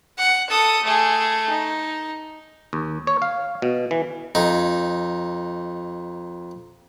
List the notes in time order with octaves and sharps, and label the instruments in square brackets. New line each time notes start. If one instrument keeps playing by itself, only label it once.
[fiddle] F#5
A4 D#6
A3 G#4
D#4
[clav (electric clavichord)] D#2
C#5
F5
B2
E3
[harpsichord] F2 D#4